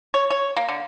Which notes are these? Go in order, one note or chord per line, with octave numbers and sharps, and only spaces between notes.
C#5
C#5
A#3
D3